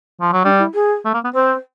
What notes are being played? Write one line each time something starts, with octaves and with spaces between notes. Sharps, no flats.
F3
F#3
G3 D4
E4
G#4
A3
A#3
B3
C4 C5